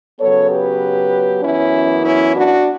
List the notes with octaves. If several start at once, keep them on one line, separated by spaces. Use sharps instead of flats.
C#3 F#3 B3 A4 C#5
G4 B4
F#2 E3 B3 C#4 E4
C#4 E4
D4 F#4